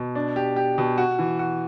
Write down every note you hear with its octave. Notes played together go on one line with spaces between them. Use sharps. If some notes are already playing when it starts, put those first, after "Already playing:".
Already playing: B2
D4
G4
G4
B2
F#4
E3
F#4